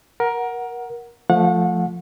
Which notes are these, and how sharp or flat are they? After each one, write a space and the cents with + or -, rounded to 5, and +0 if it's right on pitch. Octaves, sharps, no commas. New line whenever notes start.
A#4 +20 F#5 +0
F3 +0 A3 +0 F#5 -30